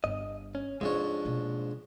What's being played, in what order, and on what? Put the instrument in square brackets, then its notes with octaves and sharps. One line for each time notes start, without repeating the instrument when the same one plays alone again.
[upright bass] G1 [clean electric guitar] D#5
[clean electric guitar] C#4
[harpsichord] F2 G#2 C#5 [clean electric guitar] G#3 D4 [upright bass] C4
[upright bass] B2 A#3